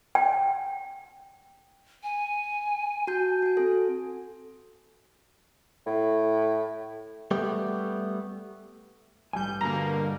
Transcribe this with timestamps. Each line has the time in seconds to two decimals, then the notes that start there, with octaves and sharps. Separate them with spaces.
0.15 G5
2.03 G#5
3.07 F#4 A5 G6
3.42 F#4 G#5
3.57 C4 A4
5.86 A2
7.31 G3 A3 B3 G4
9.33 A1 G2 G3 G#5 G6
9.61 B2 D3 A#3 A#5